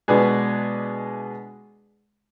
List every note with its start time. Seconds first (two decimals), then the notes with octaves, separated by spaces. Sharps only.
0.08 B2 G#3 D4 G#4 B4